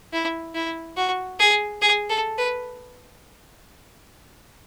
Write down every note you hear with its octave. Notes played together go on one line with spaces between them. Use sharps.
E4
E4
F#4
G#4
G#4
A4
B4